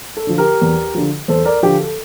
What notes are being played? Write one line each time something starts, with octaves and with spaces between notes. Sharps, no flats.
A4
D3 F3
G4 A#4
E2
D3 F3
E2 A4 C5
A#4 D5
D3 F3 G4
A4